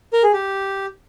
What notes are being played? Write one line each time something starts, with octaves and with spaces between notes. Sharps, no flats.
A#4
G#4
G4